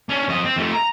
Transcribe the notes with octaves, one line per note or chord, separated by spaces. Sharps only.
C#4 D4
F2 D#5
C4
F2 A3
A#5